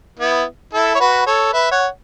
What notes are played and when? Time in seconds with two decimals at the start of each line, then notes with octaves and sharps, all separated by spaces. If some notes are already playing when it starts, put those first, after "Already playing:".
0.19 B3 E4
0.74 E4 A4
0.95 C#5
1.00 F#4 B4
1.26 A4 C#5
1.53 B4 E5
1.71 C#5 F#5